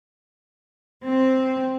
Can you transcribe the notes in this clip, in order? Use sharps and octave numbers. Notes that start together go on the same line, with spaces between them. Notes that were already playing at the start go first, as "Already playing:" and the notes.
C4